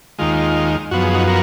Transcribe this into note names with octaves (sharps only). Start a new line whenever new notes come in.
D#2 D#3 G#3 F4
F#2 F3 B3 F#4
G#4
D#4 F#4
F#4 A#4